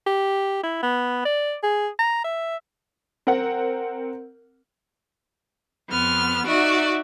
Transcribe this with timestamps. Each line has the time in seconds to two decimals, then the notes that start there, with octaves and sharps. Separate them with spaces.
0.07 G4
0.64 E4
0.83 B3
1.25 D5
1.63 G#4
1.99 A#5
2.24 E5
3.27 C4 A#4 F#5
5.90 F2 B3 F6
6.46 D#4 F#4 D5 E5